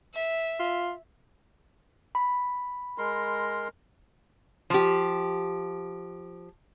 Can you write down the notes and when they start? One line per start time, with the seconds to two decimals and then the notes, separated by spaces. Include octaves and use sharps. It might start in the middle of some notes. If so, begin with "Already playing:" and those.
0.15 E5
0.60 F4
2.15 B5
2.98 G#3 A#4 C6
4.70 F3 G4